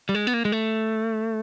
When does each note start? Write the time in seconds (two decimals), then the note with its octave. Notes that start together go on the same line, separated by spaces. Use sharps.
0.09 G3
0.15 G#3
0.27 B3
0.34 A#3
0.45 G#3
0.52 A3